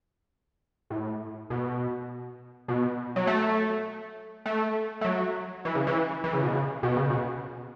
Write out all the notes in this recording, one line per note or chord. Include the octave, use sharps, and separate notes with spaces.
A2
B2
B2
F#3
A3
A3
A3
F#3
E3
C#3
E3
E3
C#3
B2
C#3
B2
C#3
B2